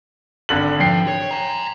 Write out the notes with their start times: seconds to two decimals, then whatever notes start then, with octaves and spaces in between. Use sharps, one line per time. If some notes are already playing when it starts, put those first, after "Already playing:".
0.49 G#1 D3 F#7
0.80 F3 G5 C7
1.08 C#5
1.31 G#5 A#5